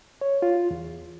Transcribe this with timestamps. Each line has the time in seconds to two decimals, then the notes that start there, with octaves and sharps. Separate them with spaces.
0.21 C#5
0.42 F4
0.71 E2